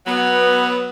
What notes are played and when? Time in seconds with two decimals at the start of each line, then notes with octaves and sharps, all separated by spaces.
0.06 F#3 B3